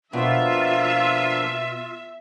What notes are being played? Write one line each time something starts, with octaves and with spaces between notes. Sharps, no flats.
B2 F3 A#3 D4 F4 E5